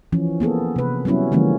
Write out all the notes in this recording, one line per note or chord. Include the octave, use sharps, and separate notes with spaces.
E3 F3 C#4
A#3 B3 G#4 A4
C3 B4
F#3 G3 B3 C#4 E4
D3 E3 F3 G#3 A#3 C#4